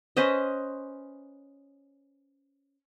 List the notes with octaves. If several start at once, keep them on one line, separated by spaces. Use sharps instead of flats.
C#4 B4 C5 D#5